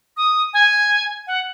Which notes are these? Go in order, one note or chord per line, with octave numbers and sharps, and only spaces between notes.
D#6
G#5
F#5